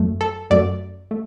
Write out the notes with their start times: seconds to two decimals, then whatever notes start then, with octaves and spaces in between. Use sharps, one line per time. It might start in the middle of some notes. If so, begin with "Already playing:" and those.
Already playing: F#2 F#3 A3
0.21 A4
0.50 F#2 F#3 A3 D5
1.11 A3